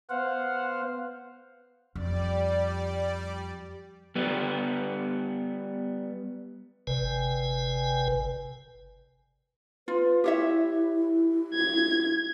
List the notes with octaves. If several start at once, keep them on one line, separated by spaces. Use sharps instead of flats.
B3 C5 F5 F#5
F2 G3 D5
G3 B3
G1 C3 B4 G#5
F4 B4
E4 G4 C#5 E5
G#6